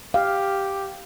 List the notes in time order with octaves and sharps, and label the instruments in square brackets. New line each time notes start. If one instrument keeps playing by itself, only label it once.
[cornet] G4 [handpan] F5